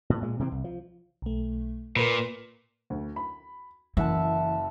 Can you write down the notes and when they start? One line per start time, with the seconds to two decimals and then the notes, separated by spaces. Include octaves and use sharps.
0.10 A2
0.22 A#2 G#3
0.39 C3 E3 F#3 C4
0.52 C2
0.64 F3
1.22 B1 A3
1.96 A#2 A#4 B4 B5
2.90 D2
3.16 B5
3.97 F#1 E3 E5 F#5 A5